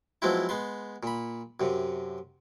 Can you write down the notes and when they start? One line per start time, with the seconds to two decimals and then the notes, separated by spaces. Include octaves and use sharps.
0.22 F3 F#3 G#3 B3 C4 E4
0.49 G#3 B3 C6
1.03 A#2 B5
1.60 F#2 C3